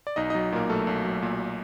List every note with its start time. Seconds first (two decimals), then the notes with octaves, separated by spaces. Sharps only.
0.07 D5
0.16 B1 D#4 D#5
0.30 F#3 D#4 D#5
0.52 A#2 A#3 A#4
0.69 B1 A3 A4
0.87 B1
1.05 F#3
1.22 A#2